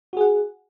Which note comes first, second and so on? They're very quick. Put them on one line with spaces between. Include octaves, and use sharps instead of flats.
F#4 G#4 F#5